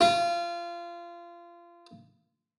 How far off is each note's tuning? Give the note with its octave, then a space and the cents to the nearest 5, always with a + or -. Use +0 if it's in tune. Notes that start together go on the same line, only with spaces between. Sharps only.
F4 -25